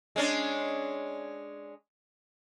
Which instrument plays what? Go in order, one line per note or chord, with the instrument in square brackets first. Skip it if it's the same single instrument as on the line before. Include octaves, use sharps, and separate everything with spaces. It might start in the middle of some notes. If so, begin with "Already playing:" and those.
[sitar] G#3 C#4 D4